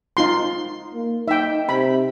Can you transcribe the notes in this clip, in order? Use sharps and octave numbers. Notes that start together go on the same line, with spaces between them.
D#4 F4 C6
A#3
D#4 E5 G5
C3 B5